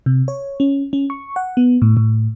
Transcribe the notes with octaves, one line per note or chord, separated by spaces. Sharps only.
C3
C#5
C#4
C#4
C#6
F#5
B3
A2
A2